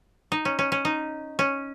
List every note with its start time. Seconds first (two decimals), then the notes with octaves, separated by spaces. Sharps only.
0.32 D#4
0.45 C#4
0.59 C#4
0.72 C#4
0.85 D#4
1.39 C#4